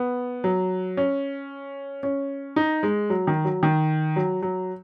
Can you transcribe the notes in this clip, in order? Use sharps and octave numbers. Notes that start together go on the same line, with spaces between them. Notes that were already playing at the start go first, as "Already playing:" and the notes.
Already playing: B3
F#3
C#4
C#4
D#4
G#3
F#3
D#3
F#3
D#3
F#3
F#3